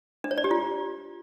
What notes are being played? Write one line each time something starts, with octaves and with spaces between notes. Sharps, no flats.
D4
C#5
D5
G4
F4